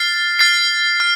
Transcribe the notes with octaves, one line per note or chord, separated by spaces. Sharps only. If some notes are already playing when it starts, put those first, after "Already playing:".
Already playing: F6 A6 C7
F6 A6 C7
F6